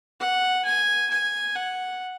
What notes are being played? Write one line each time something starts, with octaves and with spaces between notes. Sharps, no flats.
F#5
G#5
G#5
F#5